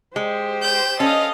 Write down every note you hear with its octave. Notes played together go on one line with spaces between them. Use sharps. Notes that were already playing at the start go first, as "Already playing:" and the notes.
G#3 G4 C5
G6 E7
C#4 A4 D#5 F5